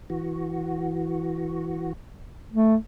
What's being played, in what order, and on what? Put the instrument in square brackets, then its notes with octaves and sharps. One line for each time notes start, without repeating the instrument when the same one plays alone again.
[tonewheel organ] E3 F#4
[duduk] A3